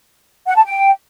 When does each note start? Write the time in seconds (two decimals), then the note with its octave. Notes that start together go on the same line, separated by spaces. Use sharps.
0.47 F#5
0.56 A5
0.65 G5